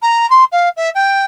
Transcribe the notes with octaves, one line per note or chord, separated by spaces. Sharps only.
A#5
C6
F5
E5
G5